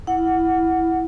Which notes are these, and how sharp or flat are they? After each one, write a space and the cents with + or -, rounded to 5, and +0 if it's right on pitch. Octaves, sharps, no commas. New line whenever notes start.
E4 +0 F#5 +0